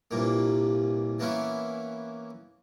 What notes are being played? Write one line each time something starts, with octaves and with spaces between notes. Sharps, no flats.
C2 G2 A#2 A#3
E3 A#3 B3 C#4 E4